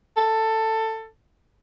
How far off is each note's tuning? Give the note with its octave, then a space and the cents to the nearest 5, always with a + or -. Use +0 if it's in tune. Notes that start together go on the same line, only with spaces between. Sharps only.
A4 +15